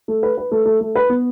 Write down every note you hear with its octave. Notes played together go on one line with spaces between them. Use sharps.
A3
B4
B4
A3
A3
A3
B4
B3